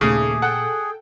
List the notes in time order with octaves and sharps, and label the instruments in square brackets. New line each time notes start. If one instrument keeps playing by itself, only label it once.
[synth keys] D#2 A3 D6 [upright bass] A#2 [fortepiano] C#3 [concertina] G#4
[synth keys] A4 G5 [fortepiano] F#5